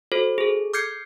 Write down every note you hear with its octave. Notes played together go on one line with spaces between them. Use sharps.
F#4 A4 C5
G#4 A4
D6 F6 G6 G#6 C7 C#7